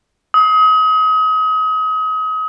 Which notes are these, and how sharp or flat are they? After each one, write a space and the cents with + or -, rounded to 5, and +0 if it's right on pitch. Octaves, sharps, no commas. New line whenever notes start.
D#6 +35